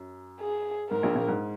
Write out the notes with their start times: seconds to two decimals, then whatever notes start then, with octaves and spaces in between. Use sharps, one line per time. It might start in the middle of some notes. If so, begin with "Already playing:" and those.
Already playing: F#2
0.41 G#4
0.90 G#2 A#4
1.03 A#1 A#2
1.15 A#1 A#2
1.28 G#2